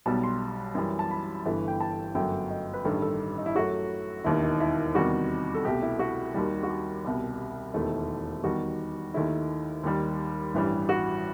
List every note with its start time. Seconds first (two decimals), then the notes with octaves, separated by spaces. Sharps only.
0.06 B1 B2 G3 A5
0.23 C6
0.75 F#2 E3 G3
0.99 A5
1.11 B5
1.45 G1 G2 E3 A3
1.68 G5
1.80 A5
2.15 G1 F#2 F#3 A3 G5
2.50 D#5
2.73 B4
2.85 A1 G2 D#3 G3 A4
3.02 A4
3.38 D#4
3.46 E4
3.55 F#2 F#3 A3 F#4
4.24 E1 D#2 D#3 E4
4.42 D#4
4.60 E4
4.94 E2 C3 D#3 G3 F#4
5.55 A4
5.65 C2 B2 A3 G4
5.82 E4
5.99 F#4
6.34 D#2 D#3 G3
6.63 F#4
6.70 G4
7.04 C2 B2 G3
7.74 E1 D#2 D#3 A3 E4
8.44 E2 D#3 G3 F#4
9.14 D#2 D#3 A3 E4
9.83 D#2 D#3 G3
10.54 A1 G2 E3 G3
10.89 F#4